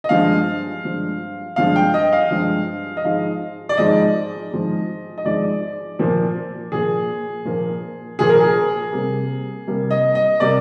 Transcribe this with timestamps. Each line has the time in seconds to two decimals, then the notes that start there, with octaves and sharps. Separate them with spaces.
0.04 D#5
0.09 G2 F3 G#3 F5
0.84 G2 F3 G#3
1.56 G2 F3 G#3 F5
1.76 G5
1.94 D#5
2.12 F5
2.31 G2 F3 G#3
2.97 D#5
3.04 G#2 F3 G#3 F5
3.69 D5
3.77 G#2 F3 G#3 D#5
4.51 G#2 F3 G#3
5.18 D#5
5.24 G#2 F3 G#3 D5
5.99 A#2 F3 A#3
6.72 A#2 F3 A#3 G#4
7.45 A#2 F3 A#3
8.19 A#2 F3 A#3 G#4
8.29 A#4
8.40 G#4
8.93 C3 G3 A#3
9.67 C3 G3 A#3
9.91 D#5
10.15 D#5
10.40 C3 G3 A#3 D5